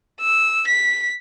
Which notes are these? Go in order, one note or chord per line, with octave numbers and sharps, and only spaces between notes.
E6
B6